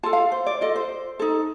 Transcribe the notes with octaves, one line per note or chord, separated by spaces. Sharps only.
F4 A4 A5
F5
C5
D5
F4 A4 D#5
C5
D#4 A4